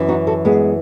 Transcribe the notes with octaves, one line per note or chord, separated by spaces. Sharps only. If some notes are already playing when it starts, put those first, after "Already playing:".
Already playing: F#2 E3
D#4 F#4
F#4 A4
G#3 B3